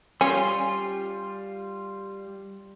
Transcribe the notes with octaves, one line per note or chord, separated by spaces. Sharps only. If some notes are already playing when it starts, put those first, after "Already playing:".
G3 C#4 F4 C6